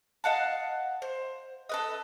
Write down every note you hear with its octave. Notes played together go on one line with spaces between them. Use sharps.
D#5 F5 F#5 A5
C5
A4 B4 D#5